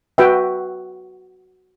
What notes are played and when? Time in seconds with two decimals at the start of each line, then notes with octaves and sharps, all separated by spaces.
0.18 F#4 B4 E5 G5